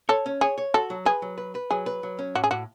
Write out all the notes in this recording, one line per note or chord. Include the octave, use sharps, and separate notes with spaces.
A4 C#5
C#4
G#4 C#5
C#5
F#4 A4
F#3
G#4 B4
F#3
B4
B4
F#3 G#4
B4
F#3
C#4
A2 F#4
G#4
A2 F#4